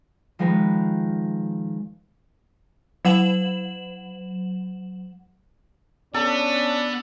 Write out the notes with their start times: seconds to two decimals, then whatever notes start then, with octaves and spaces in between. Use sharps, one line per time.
0.39 D#3 F3 G#3 A#4 B4
3.05 F#3 F#5 E7 F#7
6.14 B3 C#4 D4 A4